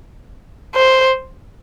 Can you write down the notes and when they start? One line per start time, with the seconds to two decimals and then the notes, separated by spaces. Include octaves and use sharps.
0.75 C5